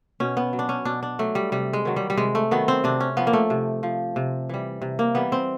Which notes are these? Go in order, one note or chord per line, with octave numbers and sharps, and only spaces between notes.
B2 C#4
B3
F#3
D4
C#4
B2 D4
D4
F#3 A3
G3
C3 G3
G#3
D#3 F#3
G3
G3
C3 G#3
A3
D#3 F#3 B3
C4
C3 D4
C#4
F3 B3
A#3
A3
C3
F3
C3
E3 G3
C3
A#3
E3 G3 B3
C4